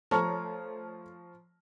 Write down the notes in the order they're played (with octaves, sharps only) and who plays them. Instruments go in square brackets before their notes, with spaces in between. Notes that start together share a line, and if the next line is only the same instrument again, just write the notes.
[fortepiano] F3 [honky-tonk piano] A3 C#5 [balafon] A5 [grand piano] A#5 C#6 F6